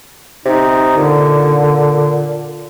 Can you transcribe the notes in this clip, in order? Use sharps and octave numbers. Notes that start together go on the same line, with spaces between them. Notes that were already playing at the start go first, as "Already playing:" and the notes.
C3 D#4
A#2 D3